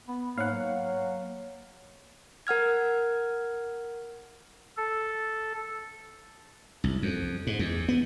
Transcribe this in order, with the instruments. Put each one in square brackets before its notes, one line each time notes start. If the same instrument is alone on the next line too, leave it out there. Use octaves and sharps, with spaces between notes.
[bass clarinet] B3
[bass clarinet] G#2 [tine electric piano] A#3 C#5 [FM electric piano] F5 F#5
[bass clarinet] F#3
F#3
[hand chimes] A#4 F#5 F6 G#6
[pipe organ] A4
[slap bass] C2
F2
G#2
E2
B3